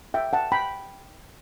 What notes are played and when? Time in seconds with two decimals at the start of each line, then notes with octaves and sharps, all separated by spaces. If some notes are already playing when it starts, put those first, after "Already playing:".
0.14 E5 G5
0.33 F#5 A5
0.52 G5 B5